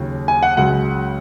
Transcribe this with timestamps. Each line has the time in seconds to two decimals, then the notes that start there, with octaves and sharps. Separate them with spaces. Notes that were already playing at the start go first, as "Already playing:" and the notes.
Already playing: D#2 C#3 F#3
0.28 G#5
0.43 F#5
0.57 C#2 C#3 F#3 F#5